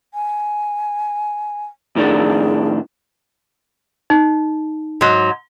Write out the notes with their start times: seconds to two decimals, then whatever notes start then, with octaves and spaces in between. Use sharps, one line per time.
0.14 G#5
1.96 A2 D#3 D4 G#4
4.10 D#4
5.01 G#2 F#3